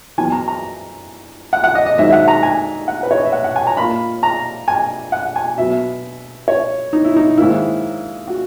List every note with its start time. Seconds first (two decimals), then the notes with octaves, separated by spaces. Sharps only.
0.18 F#2 E3 B3 G#5
0.32 A#5
0.48 A#5
1.53 F#5
1.64 F#5
1.75 D#5
1.86 D#5
1.98 G#2 D#3 F#3 E5
2.08 E5
2.12 F#5
2.28 A#5
2.43 G#5
2.88 F#5
3.03 B4
3.11 C#5
3.18 D#5
3.25 E5
3.32 F#5
3.44 F#5
3.56 G#5
3.67 A#5
3.77 A#2 A#3 B5
4.23 A#5
4.68 G#5
5.12 F#5
5.36 G#5
5.57 B2 F#3 B3 E5
6.48 C#5
6.93 D#4
7.05 E4
7.17 D#4
7.38 G#2 D#3 A#3 E4
8.28 F#4